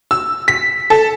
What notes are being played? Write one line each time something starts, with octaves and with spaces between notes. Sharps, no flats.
E6
B6
A4